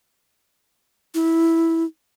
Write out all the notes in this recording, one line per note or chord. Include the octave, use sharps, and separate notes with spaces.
E4